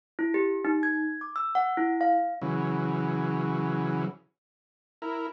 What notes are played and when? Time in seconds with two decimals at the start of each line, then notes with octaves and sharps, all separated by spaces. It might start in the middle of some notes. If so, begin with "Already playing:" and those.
0.19 E4
0.34 G4
0.65 D#4
0.83 G#6
1.21 D6
1.36 E6
1.55 F#5
1.77 E4
2.01 F5
2.42 C#3 E3 F#3
5.02 E4 A#4